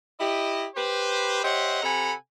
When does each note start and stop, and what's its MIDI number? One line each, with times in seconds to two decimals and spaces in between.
0.20 0.66 64
0.20 0.66 67
0.20 0.66 75
0.76 1.43 67
0.76 1.43 71
0.76 1.43 72
1.44 1.79 67
1.44 1.79 72
1.44 1.79 73
1.44 1.79 75
1.44 1.79 76
1.44 1.79 78
1.83 2.12 48
1.83 2.12 69
1.83 2.12 78
1.83 2.12 80
1.83 2.12 82
1.83 2.12 83